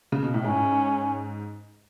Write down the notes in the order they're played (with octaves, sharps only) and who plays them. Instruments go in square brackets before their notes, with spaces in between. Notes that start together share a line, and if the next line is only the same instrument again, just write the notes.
[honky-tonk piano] C#3
B2
A2
[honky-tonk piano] G#2 [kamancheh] C#4